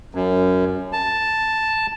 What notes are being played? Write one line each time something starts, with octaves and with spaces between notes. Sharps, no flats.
F#2
A5